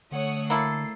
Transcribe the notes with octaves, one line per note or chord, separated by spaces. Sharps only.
D3 A3 C#5 F#5 D#6
A#3 E4 A4 C7